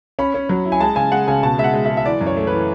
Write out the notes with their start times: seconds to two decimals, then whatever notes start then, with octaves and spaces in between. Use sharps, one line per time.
0.19 C#4 B5
0.34 C#4
0.49 F#3
0.65 E4
0.72 G#5
0.81 G#3 A5
0.96 C#3 G#5
1.12 G#3 F#5
1.28 C#3 G#5
1.43 B2 A5
1.58 G#3 E5
1.64 F#5
1.74 G#3
1.85 E5
1.90 G#3
1.97 E5
2.05 E3 D5
2.21 F#2
2.27 C#5
2.37 A3
2.47 E3 B4